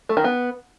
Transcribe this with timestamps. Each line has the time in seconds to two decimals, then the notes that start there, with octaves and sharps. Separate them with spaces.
0.09 A3
0.17 D#3
0.24 B3